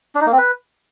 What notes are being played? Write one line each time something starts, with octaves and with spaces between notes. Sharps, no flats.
D4
D#4
A#3
C4
B4